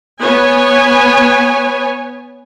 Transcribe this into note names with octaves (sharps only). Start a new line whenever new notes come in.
B3 C#5 G#5